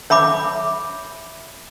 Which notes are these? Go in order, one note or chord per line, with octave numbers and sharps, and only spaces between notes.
C#5 E5 B5 D6